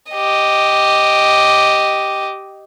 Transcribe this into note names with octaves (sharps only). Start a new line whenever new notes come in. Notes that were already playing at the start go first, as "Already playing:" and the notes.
G4 D#5